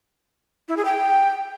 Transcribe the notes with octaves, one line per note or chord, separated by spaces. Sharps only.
E4
G#4
G5